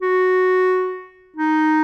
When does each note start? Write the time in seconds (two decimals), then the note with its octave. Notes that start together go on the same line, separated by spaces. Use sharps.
0.02 F#4
1.36 D#4